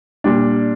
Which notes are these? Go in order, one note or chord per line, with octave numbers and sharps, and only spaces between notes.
A#2 G3 D4